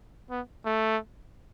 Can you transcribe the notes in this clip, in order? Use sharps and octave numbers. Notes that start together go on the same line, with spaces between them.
B3
A3